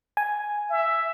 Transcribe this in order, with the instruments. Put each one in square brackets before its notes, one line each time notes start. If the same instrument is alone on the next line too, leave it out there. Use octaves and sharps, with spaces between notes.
[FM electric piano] G#5
[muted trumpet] E5